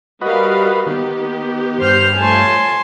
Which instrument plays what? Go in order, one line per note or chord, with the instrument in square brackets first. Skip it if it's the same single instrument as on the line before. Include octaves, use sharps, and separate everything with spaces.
[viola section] G3 A#4 F5 [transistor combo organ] F#4 B4 D#5
[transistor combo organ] D#3 [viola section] B3 G4
[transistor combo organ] G2 [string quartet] C5 F6 G6
[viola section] F3 A3 C#5 [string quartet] G#5 A5 C6